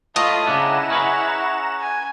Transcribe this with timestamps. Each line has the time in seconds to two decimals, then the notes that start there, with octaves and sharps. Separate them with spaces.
0.16 A2 A3 F4 D#5 A5 B6
0.47 C#3 B3 D4 E4 F#5 A#5 E7
0.90 C#4 G#4 B4
1.81 G#5